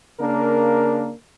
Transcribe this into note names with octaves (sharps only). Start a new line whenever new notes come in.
C#3 A#3 D4 A#4